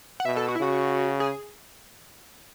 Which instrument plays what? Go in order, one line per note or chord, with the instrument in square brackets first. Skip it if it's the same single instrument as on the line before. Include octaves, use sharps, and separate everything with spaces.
[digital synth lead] F#5
[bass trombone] B2 [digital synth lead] E5
[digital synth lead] A4
F#4
E4
[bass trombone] C#3 [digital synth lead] F#4
[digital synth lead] G#4